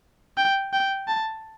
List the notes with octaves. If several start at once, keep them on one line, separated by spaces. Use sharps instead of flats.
G5
G5
A5